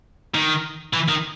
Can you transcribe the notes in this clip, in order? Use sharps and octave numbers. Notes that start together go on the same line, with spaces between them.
D#3
E3
D#3